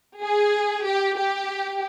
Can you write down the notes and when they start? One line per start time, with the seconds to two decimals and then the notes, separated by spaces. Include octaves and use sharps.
0.22 G#4
0.85 G4
1.18 G4